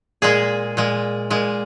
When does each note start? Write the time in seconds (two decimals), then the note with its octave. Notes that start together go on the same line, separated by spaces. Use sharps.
0.22 A#2 G#3 G#4
0.77 A#2 G#3
1.30 A#2 G#3